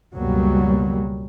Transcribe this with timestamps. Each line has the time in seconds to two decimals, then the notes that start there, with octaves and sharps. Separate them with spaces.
0.13 C#2 F#2 B2 F#3 G3 A#3